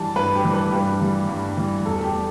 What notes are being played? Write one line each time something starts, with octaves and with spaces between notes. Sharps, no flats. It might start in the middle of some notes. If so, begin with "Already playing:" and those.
Already playing: G2 E3 G3 A5
G2 B4
G4
E3 G3
B4
G2 G4
E3 G3
G2
E3 G3
E2 A4
A4
G4
G3